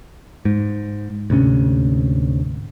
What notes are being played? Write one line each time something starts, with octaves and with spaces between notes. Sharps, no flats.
G#2
D2 G#2 C3 C#4